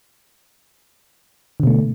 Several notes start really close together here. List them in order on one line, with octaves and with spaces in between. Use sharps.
D3 B2 A3